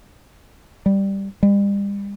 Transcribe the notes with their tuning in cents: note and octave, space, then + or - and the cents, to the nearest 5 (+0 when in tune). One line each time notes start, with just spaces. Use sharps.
G3 +5
G3 +40